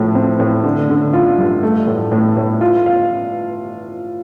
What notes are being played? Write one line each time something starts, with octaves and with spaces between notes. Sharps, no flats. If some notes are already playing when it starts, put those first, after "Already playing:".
Already playing: A2 F3
C4
A2
D3
D3
F4
G2
A3
A2
A2
A2
F4
F5